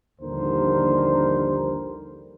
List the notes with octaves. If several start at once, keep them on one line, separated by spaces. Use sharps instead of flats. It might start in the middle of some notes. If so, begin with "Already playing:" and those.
A#1 D#2 D3 G3 A#4 C5